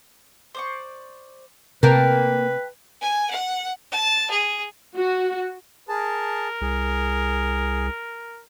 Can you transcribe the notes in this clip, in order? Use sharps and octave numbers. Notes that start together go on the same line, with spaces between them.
C5 D5 C#6
C3 A#3 A#4 B4 F5 G5 A5
G#5
F#5
A5
G#4
F#4
G#4 A#4 A5
C2 G#4